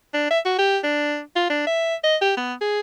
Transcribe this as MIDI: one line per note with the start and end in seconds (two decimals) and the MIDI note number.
0.14 0.27 62
0.30 0.39 76
0.45 0.56 66
0.58 0.78 67
0.83 1.20 62
1.36 1.46 65
1.50 1.62 62
1.67 1.95 76
2.03 2.16 75
2.21 2.33 67
2.37 2.53 59
2.61 2.80 68